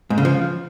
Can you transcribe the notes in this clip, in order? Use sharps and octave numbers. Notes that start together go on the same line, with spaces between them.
G#2
C#3
F3